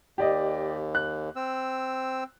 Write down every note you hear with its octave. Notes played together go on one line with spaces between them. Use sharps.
D#2 G4 D5 D#5
F#6
C4 E6